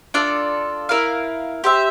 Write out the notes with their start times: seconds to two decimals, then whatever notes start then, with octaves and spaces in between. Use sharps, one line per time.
0.14 D4 F4 A4 D5
0.89 E4 A#4 F5
1.64 G4 C5 E5